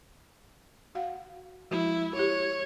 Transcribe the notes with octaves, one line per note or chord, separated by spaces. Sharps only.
F#4 F5 F#5
F3 G#3 E4 F#4
E4 G4 C#5